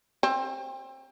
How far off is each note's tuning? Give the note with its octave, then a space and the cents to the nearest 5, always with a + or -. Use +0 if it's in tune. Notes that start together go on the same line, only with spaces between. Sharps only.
C4 +25